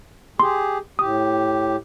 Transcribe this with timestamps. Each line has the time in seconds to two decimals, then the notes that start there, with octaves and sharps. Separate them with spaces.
0.40 G4 G#4 C6
0.99 A2 G4 D#6